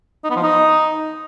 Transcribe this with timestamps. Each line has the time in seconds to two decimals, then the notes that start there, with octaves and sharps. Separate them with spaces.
0.24 D#4
0.30 B3
0.36 F3
0.43 D#4